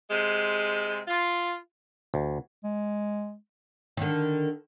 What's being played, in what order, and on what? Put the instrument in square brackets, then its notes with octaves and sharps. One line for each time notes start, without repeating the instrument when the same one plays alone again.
[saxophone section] C3 G#3
F4
[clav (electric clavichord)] D2
[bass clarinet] G#3
[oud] D3 D#3